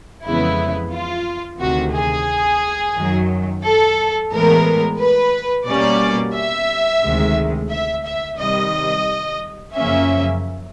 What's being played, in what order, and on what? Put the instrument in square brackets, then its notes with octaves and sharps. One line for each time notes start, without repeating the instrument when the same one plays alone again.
[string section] F2 C#3 E3 G#3 B3 E4
F4
D2 C3 D#3 F#4
G#4
F#2 D#3 F#3
A4
A2 E3 G#3 B3 A#4
B4
B2 G3 A#3 C#4 D5
E5
D2 C3 D#3 G#3
E5
E5
C3 D#3 G3 D#5
F#2 C#3 F3 A#3 C#4 E5